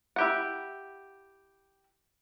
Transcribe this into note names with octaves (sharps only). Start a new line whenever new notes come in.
E4 G4 F#5